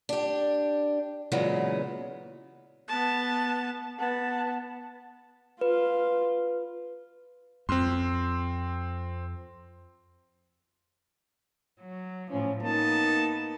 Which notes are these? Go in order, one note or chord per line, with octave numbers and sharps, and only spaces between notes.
D4 G4
A#2 C#3 E3 F#3 G#3 B3
B3 A5
B3 A5
F4 B4
F2 C4 C6
F#3
A2 F3 C#4
A#3 B3 D#4 A5